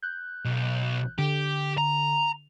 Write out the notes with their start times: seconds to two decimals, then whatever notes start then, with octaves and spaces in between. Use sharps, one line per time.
0.03 F#6 G6
0.45 B1
1.18 D3 G4
1.78 A#5